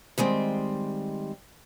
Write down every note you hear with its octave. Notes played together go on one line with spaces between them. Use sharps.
D#3 G3 G#3 C4